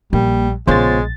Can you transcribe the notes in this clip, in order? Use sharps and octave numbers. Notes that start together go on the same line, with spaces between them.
A#1 G3 A#3
A#1 C#3 G#3 B3 F4 C5 C#5 A6